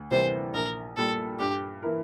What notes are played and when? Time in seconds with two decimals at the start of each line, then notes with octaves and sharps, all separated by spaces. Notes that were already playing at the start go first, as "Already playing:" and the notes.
Already playing: D2
0.11 C3 E3 G3 A#3 C5
0.54 A#1 A#4
0.97 A#2 G3 A4
1.39 G2 G4
1.83 E3 A#3 E4 A#4